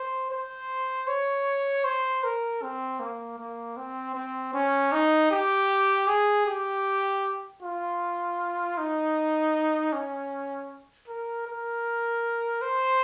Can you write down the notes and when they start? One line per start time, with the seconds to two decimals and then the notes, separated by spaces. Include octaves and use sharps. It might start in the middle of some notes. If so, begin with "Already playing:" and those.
Already playing: C5
0.31 C5
1.07 C#5
1.84 C5
2.24 A#4
2.62 C4
3.00 A#3
3.38 A#3
3.77 C4
4.15 C4
4.53 C#4
4.92 D#4
5.31 G4
6.07 G#4
6.46 G4
7.62 F4
8.78 D#4
9.93 C#4
11.08 A#4
11.47 A#4
12.62 C5